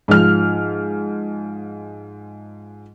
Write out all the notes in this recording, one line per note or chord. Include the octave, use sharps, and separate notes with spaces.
G#2 F3 F6